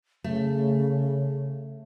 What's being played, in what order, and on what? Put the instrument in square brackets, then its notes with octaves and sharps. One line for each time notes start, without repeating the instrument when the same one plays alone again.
[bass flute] C#3 [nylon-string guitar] A3